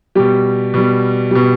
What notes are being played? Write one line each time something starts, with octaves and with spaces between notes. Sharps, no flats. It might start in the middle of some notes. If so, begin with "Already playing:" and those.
B2 G3 G4
B2 G3
B2 G3